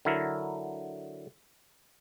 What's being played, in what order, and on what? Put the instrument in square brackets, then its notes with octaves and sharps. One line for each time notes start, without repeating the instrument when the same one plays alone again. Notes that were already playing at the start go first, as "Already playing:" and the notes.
[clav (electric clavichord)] D3 F#3 E4 A#4